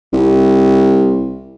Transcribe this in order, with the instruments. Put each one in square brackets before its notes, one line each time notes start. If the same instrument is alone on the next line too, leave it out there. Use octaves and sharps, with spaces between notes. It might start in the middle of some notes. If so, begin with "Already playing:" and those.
[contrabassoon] C2